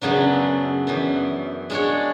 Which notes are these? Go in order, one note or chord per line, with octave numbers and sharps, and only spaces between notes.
F#2 C#3 F#3 B3 D4
F#2 E3 B3
G#3 D4 F#4 C#5